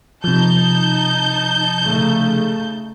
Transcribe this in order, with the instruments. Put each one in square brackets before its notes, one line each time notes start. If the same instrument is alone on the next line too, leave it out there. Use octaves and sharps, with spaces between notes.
[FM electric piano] C3 F3 [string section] D#4 A5 G6
[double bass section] C#3 A3